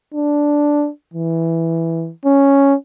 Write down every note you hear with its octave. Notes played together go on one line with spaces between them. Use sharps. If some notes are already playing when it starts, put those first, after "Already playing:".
D4
E3
C#4